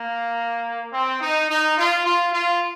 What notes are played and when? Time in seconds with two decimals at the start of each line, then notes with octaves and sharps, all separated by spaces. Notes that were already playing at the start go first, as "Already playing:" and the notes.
Already playing: A#3
0.92 C4
1.21 D#4
1.49 D#4
1.77 F4
2.05 F4
2.33 F4